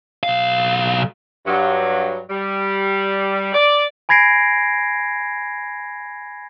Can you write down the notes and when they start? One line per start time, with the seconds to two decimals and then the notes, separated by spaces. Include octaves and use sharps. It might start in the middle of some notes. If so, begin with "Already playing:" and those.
0.23 B1 F5
1.46 G2 F#3
2.30 G3
3.53 D5
4.09 G#5 B5 G#6 A#6 C7 D7